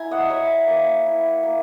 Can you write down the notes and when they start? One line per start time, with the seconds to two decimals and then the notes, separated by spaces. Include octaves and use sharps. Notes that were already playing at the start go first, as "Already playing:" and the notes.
Already playing: E4 G#5 A#5
0.11 D#5 F#5
0.30 E4 C#5 E5
0.67 A#3
1.06 E4
1.43 A#3